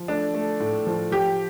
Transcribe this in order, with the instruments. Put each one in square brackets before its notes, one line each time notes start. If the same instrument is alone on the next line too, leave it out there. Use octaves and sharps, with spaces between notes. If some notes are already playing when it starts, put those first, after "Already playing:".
Already playing: [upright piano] F3
[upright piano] A3 [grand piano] D4
[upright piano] A3
A2
F3
[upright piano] F3 [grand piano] G4